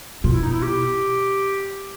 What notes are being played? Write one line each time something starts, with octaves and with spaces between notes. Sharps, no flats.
B2 F4
E4
D#4
E4
G4